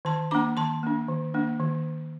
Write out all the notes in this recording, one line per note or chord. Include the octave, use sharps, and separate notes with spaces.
D#3 A5 C6
A#3 D4 A#5 D6
D#3 A5 C6
A#3 D4
D#3
A#3 D4
D#3